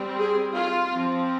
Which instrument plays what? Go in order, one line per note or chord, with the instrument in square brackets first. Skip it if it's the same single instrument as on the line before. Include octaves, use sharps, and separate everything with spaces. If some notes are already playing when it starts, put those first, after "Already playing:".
Already playing: [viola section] G3 C4
G#4
F4
F3 C4